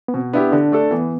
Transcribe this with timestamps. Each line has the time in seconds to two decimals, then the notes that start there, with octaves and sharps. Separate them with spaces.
0.08 B3
0.14 B2 C4
0.33 B3 D4 E4 G4
0.52 D3 D4
0.72 A3 D4 A4
0.91 E3 B3